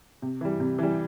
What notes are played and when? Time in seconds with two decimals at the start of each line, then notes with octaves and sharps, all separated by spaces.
0.22 C3
0.41 E3 G3
0.60 C3
0.79 E3 G3